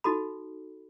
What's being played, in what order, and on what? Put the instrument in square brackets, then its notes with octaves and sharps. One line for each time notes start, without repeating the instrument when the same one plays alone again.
[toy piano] D#4 F#4 A4 B5